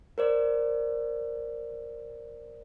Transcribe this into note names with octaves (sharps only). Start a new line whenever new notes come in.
A#4 C5 D5